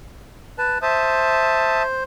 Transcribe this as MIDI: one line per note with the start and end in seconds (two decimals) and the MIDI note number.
0.58 0.78 71
0.58 0.78 81
0.82 2.04 72
0.82 1.82 76
0.82 1.82 81
0.82 1.82 87